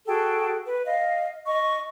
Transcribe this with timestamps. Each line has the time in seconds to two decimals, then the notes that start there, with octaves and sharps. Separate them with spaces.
0.07 F#4 G#4 A4 G5
0.65 B4
0.85 D#5 F5
1.45 D#5 C#6